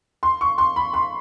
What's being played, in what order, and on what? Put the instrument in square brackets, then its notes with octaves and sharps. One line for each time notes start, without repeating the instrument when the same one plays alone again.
[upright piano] C6
C#6
C6
B5
C6